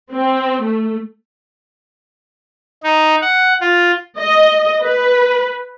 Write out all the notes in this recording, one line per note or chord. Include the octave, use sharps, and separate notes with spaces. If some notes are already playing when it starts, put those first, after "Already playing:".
C4
A3
D#4
F#5
F4
D#5
B4